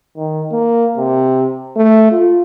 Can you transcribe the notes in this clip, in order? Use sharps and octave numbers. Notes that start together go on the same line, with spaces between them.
D#3
A#3
C3
A3
F4